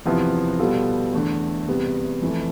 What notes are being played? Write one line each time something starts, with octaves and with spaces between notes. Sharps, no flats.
E2 C3 F3 B3 E4
B2 G3 B3 F4 A4
E2 D3 A3
E2 C3 G3 B3
F2 E3 A3